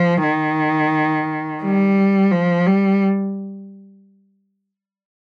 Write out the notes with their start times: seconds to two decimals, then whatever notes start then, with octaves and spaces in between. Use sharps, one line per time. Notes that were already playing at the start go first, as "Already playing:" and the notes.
Already playing: F3
0.23 D#3
1.63 G3
2.31 F3
2.66 G3